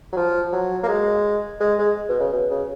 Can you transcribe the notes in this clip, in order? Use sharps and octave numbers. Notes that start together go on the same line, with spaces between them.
F#3
F3
F#3
A#3
G#3
G#3
G#3
B2
C#3
B2
C#3